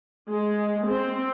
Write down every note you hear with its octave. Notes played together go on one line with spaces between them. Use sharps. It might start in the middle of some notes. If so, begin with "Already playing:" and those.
G#3
C4